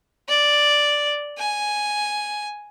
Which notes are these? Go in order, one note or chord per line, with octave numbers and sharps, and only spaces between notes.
D5
G#5